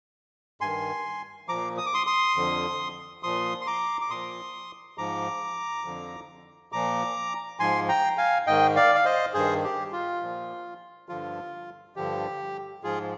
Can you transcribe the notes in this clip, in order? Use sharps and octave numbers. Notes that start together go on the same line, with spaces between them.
G2 D#3 G#5 C6
A#2 F3 A#5 D6
D#6
D6
C6 D#6
C6 D#6
F2 D3 F3
A#2 F3 C6 D#6
C6
A#5 D6
D6
A#2 F3 C6 D#6
G#2 F3 A#5 D6
F2 D3 F3
A#2 F3 A#5 D6
G#2 F3 G#5 C6
G5 A#5
F5 G#5
G#2 D#3 D#5 G5
D5 F5
F5
C5 D#5
G2 D#3 G#4 C5
G4
F4
A#2 F3
G2 D3 F3 F4
G2 D3 F3 G4
G#2 F3 F4 G#4